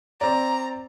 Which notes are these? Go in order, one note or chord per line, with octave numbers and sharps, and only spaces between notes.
C4 D5 A#5